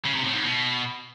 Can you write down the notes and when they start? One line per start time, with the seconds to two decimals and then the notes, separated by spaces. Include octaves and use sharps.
0.05 C#3
0.15 C3
0.24 A2
0.34 G#2
0.43 B2